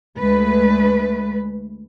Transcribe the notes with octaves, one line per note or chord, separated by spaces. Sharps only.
D2 G#3 A3 B4